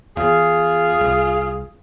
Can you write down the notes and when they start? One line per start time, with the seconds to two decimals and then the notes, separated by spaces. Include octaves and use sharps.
0.17 E2 F4 G#4
1.01 C2